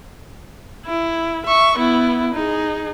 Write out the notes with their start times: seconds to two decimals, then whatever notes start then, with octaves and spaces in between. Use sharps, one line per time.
0.86 E4
1.46 E5 C#6
1.78 B3 E4
2.34 D#4 G#4